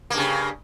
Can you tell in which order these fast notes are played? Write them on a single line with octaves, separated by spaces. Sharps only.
A#3 G2 C#3